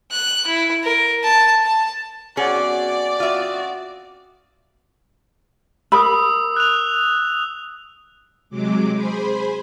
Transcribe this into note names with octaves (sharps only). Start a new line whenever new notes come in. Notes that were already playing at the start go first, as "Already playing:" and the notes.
F#6
E4
A#4
A5
A5
F#2 B2 C4 C#4 G#4 D5 F#5
F4 F#4 D#5 E5 C6
A#4 B5 D#6 E6
F#6 F7
C3 F#3 G#3 D6
G#4 C5 B5